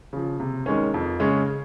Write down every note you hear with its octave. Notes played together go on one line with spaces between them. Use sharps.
C#3 F3
C3
D#3 G#3 C#4
F2
C#3 G#3 C#4